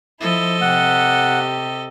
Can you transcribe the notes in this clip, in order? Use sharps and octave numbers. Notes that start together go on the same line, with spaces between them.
F3 E4 A4 D#5
C3 G4 F#5